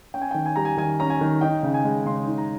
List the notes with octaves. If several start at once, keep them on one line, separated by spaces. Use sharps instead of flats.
C#4 G5
G#5
D#3 G5
G#5
G3 A#5
G#5
D#3 G#5
C#4 A#5
G#5
D#3
D#4 G5
C#3
G#5
G#3
C#3 C6
D#4
A#5